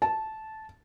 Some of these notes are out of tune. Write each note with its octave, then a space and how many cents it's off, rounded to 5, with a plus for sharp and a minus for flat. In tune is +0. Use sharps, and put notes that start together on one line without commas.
A5 -10